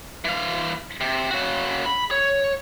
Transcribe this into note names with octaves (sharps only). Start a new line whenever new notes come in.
E3 F5
C3
C#3 F#4
B5
C#5